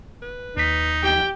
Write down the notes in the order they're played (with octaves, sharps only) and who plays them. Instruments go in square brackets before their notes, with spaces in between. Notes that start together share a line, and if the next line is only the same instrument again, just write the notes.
[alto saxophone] B4
[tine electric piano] D#2 B6 [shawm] D#4
[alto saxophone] G4 [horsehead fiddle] G5